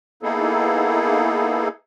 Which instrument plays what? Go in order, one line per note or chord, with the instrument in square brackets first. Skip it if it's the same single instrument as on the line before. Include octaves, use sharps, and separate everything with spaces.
[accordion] A#3 B3 D#4 E4 G#4 A4